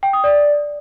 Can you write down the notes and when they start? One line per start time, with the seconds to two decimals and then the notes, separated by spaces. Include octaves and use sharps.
0.03 G5
0.13 D#6
0.24 D5